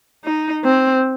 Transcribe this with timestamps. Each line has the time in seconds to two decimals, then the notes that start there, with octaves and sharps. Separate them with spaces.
0.24 D#4
0.64 C4